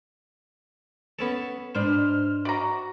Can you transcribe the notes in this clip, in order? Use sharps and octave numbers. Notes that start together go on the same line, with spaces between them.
B3 C#4 A4
G#2 D4 B4 C5 F6
F#4 D5 A#5